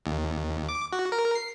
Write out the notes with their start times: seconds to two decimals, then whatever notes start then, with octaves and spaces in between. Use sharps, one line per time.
0.06 D#2
0.69 D6
0.93 F#4
1.12 A#4
1.35 C7